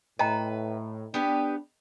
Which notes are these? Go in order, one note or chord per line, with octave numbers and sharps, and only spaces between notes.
A2 B4 D#5 G5 A#5
B3 D4 G4 B4